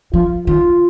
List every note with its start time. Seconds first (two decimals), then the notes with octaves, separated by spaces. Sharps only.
0.14 F3 F4
0.47 D#3 F4